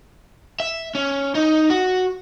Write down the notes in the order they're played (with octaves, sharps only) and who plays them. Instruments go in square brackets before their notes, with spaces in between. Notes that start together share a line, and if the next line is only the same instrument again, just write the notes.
[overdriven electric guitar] E5
C#4
D#4
F#4